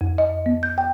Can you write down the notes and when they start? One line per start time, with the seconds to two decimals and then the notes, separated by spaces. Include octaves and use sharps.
0.01 F2
0.18 D#5
0.46 B3
0.63 G6
0.78 G5